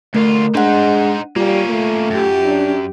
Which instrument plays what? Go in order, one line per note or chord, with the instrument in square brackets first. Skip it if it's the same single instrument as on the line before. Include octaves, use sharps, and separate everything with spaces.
[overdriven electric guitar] D2 F4 [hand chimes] A3 A#4
[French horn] G#3 [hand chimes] D4 F#5 [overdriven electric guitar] D#4 C5
[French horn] G3 [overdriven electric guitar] A#3 C#4 [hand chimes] F4
[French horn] A3
[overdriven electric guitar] F#2 [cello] G4
[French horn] D4